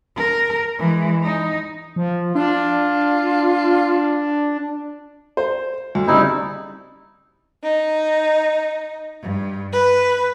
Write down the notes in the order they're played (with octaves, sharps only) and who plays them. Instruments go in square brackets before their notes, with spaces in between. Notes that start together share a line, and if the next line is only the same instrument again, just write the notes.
[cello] A#4
E3 G#3
D#4
[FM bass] F3
[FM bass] D4 [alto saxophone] F4
[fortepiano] C5
D2
[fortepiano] C#3 G3 C4 [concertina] D#4 E4
[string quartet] D#4
G2
B4